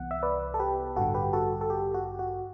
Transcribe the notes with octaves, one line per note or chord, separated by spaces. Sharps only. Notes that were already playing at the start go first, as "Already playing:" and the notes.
Already playing: C2 C3 E3 B3 F#5
E5
B4 D5
A4
G4 B4
A1 G2 D3 F#4 A4
G4 B4
F#4 A4
A4
G4
F#4
F#4